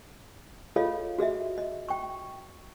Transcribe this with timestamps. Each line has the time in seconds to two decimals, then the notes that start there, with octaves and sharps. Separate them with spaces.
0.76 F4 G#4 A4 C#5 D#5 F5
1.18 F#4 G#4 D#5 E5
1.58 D#5
1.89 G5 C#6